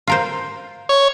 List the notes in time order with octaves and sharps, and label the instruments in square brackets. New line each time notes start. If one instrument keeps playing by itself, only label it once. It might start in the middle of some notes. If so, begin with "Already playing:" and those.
[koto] F4 A#4 C5
[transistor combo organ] C#5